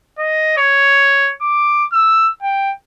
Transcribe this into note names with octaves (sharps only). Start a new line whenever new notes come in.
D#5
C#5
D6
E6
G5